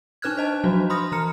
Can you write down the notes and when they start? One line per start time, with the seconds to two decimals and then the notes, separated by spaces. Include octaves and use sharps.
0.22 D4 D#4 B4 F6 F#6 G#6
0.37 C5 D#5 A5
0.64 F3 F#3 D4 F#4
0.90 B5 C6 D#6 F6 A#6
1.12 E3 A#5 F6 C#7